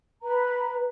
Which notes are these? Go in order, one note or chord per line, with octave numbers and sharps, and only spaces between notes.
B4 A#5